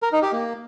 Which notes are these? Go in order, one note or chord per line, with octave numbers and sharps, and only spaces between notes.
A#4
D#4
G4
A#3